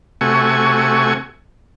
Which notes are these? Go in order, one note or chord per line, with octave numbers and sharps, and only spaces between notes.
C3 A3 F#4 G#5 C#6